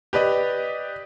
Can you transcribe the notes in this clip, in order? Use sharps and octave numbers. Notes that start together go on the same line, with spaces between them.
G4 B4 D5 D#5